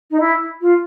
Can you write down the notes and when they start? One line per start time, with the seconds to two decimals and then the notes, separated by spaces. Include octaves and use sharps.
0.11 D#4
0.20 E4
0.61 F4